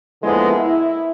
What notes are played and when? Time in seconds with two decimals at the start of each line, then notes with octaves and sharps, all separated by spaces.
0.23 D3 F3 G#3 A#3 B3 E4
0.55 E4